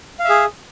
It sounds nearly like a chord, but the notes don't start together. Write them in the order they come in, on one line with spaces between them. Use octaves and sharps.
F5 E5 G#4